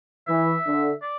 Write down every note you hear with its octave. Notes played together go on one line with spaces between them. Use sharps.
E3 E5
D3
D5